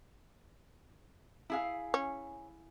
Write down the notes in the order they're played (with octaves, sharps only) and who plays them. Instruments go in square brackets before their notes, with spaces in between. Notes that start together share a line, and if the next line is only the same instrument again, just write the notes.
[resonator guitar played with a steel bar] E4 G#4 F5
[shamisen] C#4